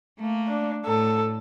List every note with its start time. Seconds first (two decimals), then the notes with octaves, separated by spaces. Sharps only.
0.18 A3 A#3
0.47 D4
0.85 A2 A4